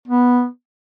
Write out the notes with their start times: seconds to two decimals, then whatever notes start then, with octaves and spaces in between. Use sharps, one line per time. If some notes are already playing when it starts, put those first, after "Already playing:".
0.08 B3